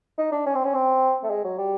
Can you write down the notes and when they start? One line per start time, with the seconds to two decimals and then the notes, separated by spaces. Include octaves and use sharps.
0.18 D#4
0.32 D4
0.46 C#4
0.55 C4
0.64 C#4
0.74 C4
1.23 A3
1.30 G#3
1.44 F#3
1.58 G3